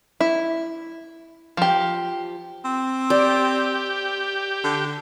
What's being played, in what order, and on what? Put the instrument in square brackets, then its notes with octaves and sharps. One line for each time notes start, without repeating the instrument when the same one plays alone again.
[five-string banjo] E4
F3 G4
[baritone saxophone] C4
[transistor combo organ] G4 [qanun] D5
[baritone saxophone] D3